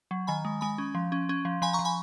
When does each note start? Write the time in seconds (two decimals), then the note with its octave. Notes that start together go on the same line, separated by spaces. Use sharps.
0.11 F#3
0.27 D#3 G#5 B5
0.45 G#3
0.61 G#3 G#5 B5
0.78 C#4
0.95 F3
1.12 C#4
1.29 C#4
1.45 F3
1.62 F3 G#5 B5
1.73 A#5 C#6
1.79 F3
1.85 G#5 B5